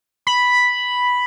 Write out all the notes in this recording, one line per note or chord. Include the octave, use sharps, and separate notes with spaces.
B5